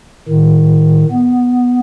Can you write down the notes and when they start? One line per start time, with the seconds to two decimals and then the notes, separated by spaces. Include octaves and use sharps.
0.28 A2 D#3
1.11 B3